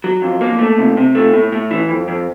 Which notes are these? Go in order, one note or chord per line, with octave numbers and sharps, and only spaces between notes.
F#3
F2
A#3
A3
C3
C3
A3
A2
A2
E3
F2
F2